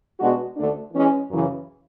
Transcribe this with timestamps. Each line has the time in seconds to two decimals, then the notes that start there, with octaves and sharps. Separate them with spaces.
0.19 B2 G#3 D4 F#4
0.56 D2 D3 A3 D4
0.93 E3 G#3 C#4
1.30 F#2 C#3 E3